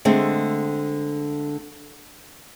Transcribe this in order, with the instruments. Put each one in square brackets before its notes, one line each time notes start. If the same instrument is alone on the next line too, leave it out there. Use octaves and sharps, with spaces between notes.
[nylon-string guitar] D3 G#3 A3 C4